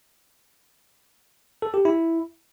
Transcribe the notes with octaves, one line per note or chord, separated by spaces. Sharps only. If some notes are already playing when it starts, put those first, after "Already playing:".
A4
G4
E4